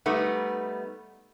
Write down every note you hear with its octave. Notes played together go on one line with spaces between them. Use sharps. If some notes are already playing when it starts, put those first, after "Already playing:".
G3 A3 B3 D#4